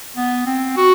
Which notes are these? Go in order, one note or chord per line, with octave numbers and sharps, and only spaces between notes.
B3
C4
F#4